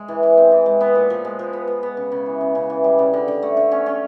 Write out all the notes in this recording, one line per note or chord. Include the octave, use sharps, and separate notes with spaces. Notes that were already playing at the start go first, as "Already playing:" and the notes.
Already playing: G#3
E3
E3
C4
E3
G#3
B3
A#2
F3
G#3
F3
B3
B3
B3
C#3
C#3
E3
C#3
C#3
E3
G3
C#3
D3
D3
A3
D3
C#4
C#4